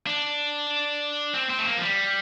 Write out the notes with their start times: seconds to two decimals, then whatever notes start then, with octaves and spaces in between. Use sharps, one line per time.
0.06 D4
1.34 C4
1.50 C4
1.59 A3
1.66 A#3
1.78 F3
1.83 G3